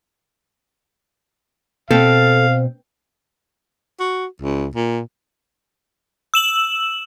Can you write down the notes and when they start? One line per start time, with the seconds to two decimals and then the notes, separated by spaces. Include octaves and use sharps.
1.91 B2 C4 A4 F5
4.00 F#4
4.42 C#2
4.75 A#2
6.34 E6 E7 F#7